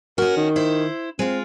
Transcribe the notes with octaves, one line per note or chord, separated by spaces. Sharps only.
C#4 F#4 A#4
D#3
E4 C5
G#3 C4 F4